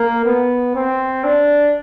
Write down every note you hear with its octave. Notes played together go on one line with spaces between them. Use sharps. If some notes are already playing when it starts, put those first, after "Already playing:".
Already playing: A#3
B3
C4
D4